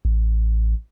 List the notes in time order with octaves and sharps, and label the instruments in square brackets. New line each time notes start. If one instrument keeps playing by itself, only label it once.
[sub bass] A1